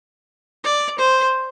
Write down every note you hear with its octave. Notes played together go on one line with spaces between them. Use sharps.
D5
C5